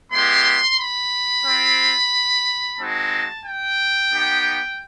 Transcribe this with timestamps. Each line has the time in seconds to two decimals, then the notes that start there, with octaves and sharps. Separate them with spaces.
0.13 G#3 B3 E4 G4 C6
0.80 B5
1.46 C4 F4
2.79 G#3 C4 D#4 F#4 A5
3.46 G5
4.12 B3 D#4 G4